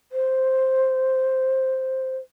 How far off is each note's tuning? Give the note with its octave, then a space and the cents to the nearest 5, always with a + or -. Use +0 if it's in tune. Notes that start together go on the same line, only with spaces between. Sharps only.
C5 +5